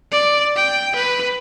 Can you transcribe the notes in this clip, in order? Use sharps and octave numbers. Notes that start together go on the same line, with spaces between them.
D5
G5
B4